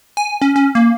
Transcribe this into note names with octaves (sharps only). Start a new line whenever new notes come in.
G#5
C#4
C#4
A#3